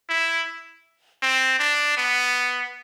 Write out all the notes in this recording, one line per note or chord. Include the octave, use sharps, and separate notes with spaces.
E4
C4
D4
B3